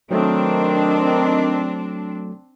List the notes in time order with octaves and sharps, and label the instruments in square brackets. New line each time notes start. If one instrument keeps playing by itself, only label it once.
[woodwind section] D#3 [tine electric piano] F#3 A3 A4 [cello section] C4 D4